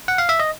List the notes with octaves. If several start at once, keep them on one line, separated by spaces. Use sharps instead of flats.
F#5
F5
E5
D#5